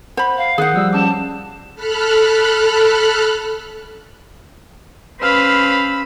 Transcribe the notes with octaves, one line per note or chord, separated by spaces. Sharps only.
C5 F#5 B5
F5
D#3 G#4 F#5 D#6 F#6 G6
F3 G3 E6
C#4 A5 D6
A4 B5 F6 F#6
C#4 B4 C5 F5 B5 E6